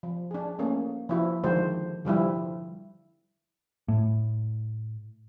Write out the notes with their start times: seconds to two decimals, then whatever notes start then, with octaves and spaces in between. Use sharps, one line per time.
0.03 F3
0.31 D4 G#4
0.59 A3 A#3 C#4
1.09 F3 E4 F#4
1.44 D3 D#3 F3 G#3 F#4 C5
2.05 D3 F3 G3 E4
3.88 A2